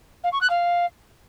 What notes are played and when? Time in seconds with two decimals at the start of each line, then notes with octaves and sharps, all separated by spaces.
0.24 F5
0.32 C#6
0.41 F#6
0.50 F5